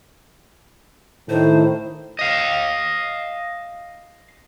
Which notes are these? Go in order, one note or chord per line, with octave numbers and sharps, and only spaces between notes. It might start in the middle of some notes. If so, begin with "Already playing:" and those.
A2 D#3 C5
D#5 F5